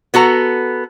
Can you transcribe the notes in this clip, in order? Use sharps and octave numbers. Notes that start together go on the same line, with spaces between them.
B3 F#4 A4 A#5